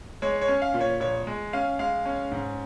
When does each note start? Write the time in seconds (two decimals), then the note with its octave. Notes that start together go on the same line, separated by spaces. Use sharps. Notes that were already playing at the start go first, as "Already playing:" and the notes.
0.22 G#3 C#5
0.41 C#5
0.48 C#4
0.62 F5
0.74 A#2
0.81 C#5
1.00 A#1 C#5
1.27 G#3
1.53 C#4 F5
1.79 G#3 F5
2.06 C#4
2.32 G#2